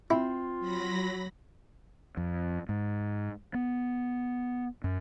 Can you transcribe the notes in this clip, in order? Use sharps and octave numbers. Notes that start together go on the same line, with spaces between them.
C4 E4 F4
F#3 B5 A#6
F2
G#2
B3
F#2